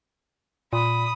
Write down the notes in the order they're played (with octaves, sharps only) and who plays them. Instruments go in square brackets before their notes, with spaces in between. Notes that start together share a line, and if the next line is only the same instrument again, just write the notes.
[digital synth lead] A#2 [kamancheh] B5 D#6